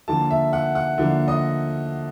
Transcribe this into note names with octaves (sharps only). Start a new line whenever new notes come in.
D3 F3 A#3 A5
E5
F#5
F#5
D3 F3 A#3
D#5